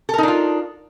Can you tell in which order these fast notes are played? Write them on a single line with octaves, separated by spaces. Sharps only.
A4 A#4 D#4 D4 F4